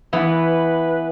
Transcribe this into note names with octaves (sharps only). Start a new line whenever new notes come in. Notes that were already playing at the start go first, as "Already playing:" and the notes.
E3 B3 B4